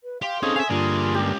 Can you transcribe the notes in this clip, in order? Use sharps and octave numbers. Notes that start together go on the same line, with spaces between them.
B4
G4 F5 C6
C4 C#4 D#4 G#4 A4 F5 D#6
E5 F5 G#5
G2 D3 A#3 F4 G#4 D5
C#2 G4